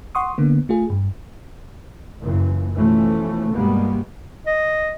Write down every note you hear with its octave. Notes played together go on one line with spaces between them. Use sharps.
F#5 C6 C#6 D#6
D3 A#3 B3
A3 F4 G#4
G2
F#1 F#2 A#2 E3
B2 E3 F3 A3 C#4
G2 B2 G3 G#3 A#3 B3
D#5